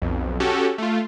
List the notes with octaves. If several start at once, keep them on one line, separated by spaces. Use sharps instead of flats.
B1 F2
C#4 F#4 G4 A4
A3 F4